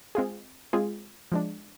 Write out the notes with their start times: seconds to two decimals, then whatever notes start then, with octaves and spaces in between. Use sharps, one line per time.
0.15 G#3 C4 F4 G#4
0.73 G#3 C4 F4 G#4
1.32 F3 G#3 D4